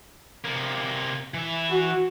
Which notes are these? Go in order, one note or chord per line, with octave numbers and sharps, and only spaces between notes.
C3 A#3
E3 E5
F#4